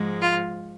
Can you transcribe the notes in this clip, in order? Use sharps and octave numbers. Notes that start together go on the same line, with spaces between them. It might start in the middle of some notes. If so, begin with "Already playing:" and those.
Already playing: G#2 F3 G#3
F4